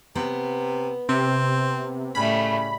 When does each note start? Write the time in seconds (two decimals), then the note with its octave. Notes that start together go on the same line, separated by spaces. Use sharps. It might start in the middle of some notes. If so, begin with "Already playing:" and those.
0.15 C3 B3
1.09 C3 C4
2.15 A2 C#3 G3 A3 B5